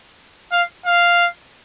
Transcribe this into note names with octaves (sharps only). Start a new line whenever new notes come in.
F5
F5